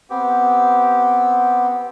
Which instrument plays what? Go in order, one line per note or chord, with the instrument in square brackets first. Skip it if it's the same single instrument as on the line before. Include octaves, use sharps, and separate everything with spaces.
[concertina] B3 C4 G4